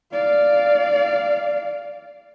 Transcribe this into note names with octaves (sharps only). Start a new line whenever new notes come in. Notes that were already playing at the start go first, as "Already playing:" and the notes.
D5 F5